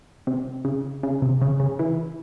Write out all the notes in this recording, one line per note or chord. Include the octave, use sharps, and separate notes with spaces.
C3
C#3
C#3
C3
C#3
C#3
E3